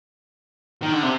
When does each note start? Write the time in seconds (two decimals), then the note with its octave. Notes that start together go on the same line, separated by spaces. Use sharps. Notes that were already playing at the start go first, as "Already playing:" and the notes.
0.82 D#3
0.93 D3
1.03 C3